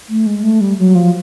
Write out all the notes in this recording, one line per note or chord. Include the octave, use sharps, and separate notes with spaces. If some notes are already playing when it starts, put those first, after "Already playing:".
A3
G#3
A3
G3
F#3
F3